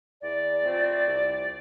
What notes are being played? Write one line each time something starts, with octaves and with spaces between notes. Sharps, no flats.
E2 D5
C3 F3 A3 C4
C2